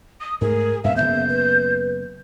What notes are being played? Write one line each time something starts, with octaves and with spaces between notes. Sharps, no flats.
D#6
G#2 A3 G#4 A#4
G2 A#2 C4 E5 F5
F#1 D#2 B3 E5 G6
B4